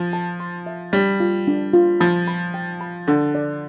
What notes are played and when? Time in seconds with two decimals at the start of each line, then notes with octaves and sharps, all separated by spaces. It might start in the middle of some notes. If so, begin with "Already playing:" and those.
Already playing: F3
0.13 A5
0.40 C6
0.66 E5
0.93 G3 D4
1.20 F4
1.47 D4
1.73 F4
2.00 F3 B5
2.28 B5
2.54 G5
2.81 B5
3.08 D3 D4
3.35 D5